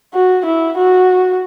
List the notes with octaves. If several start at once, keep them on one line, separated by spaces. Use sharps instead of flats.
F#4
E4
F#4